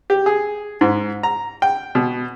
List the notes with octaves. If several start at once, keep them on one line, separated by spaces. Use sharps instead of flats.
G4
G#4
G#2
A#5
G5
B2